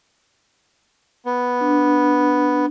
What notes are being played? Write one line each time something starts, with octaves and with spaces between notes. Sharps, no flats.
B3
D4